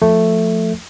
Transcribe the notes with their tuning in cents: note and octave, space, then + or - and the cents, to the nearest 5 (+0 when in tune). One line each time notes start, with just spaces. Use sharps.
F3 +0 A3 +5